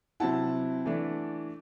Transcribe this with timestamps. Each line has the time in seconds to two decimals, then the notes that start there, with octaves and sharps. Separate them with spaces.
0.20 C3 F#3 C4 E4 F#5 A5
0.86 E3 A3 D4